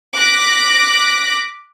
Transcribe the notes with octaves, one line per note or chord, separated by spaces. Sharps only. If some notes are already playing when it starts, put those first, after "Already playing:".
D6 F#6 A#6 B6